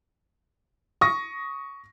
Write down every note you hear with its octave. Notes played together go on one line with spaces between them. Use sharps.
C#6 D#6 A#6